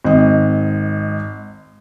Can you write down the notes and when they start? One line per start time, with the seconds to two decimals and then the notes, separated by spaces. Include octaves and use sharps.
0.04 G#1 D#5